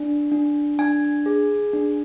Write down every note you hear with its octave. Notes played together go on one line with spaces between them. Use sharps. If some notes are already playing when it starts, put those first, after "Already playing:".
Already playing: D4
D4
D4 G#5
G#4
D4